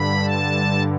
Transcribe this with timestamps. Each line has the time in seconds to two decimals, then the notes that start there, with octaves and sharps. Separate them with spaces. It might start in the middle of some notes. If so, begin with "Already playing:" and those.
Already playing: G2 D3 B5
0.24 A5